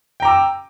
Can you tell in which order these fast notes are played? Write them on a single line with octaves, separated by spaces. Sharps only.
G5 A#5 D6 E6